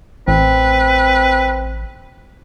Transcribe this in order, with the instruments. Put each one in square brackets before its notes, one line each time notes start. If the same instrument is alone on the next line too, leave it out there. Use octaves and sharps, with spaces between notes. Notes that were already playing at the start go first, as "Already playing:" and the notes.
[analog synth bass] A1 [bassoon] C4 [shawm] B4